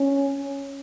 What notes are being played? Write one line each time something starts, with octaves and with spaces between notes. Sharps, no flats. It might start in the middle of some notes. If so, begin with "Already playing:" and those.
Already playing: C#4